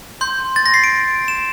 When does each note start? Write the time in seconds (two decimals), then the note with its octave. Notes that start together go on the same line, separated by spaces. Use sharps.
0.21 C6 G6
0.56 A6
0.66 A#6
0.74 C7
0.84 D7
1.28 E7